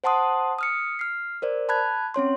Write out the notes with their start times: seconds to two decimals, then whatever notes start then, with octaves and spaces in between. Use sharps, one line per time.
0.04 C5 F#5 A5 C6 D#6
0.59 D#6 F6 C#7
0.99 F6 C7
1.42 A#4 C5 D5
1.69 A5 B5 F#6 G#6
2.14 C4 C#4 C#5 C6